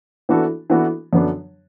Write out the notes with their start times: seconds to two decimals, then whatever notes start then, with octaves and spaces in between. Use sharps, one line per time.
0.29 E3 B3 D4 F#4 A4
0.70 E3 B3 D4 F#4 A4
1.13 F#2 D3 F#3 B3 D4